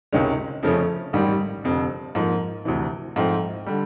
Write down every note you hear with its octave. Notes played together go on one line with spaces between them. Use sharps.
C#2 C3 D#3 G#3 C#4
F2 C#3 F3 A3 C#4
A1 G#2 D#3 G3
F1 F2 D3
G#2 F3 A#3
D2 C3 E3
G#2 F3 A3 C4
D3 G3